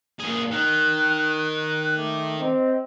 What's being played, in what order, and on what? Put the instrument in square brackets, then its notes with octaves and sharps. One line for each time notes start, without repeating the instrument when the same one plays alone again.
[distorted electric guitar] A#2 G#4
[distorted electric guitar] D#3 [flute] F#6
[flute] F#6
[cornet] A3 [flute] D6
[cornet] C4 [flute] D#5